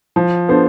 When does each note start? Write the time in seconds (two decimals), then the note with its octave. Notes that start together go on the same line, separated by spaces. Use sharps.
0.16 F3
0.48 B3 D4 A4 C5